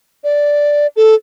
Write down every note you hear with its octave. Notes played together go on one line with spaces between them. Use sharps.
D5
A4